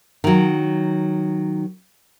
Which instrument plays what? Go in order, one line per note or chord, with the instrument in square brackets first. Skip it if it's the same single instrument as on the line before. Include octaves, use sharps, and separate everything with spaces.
[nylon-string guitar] D#3 F#3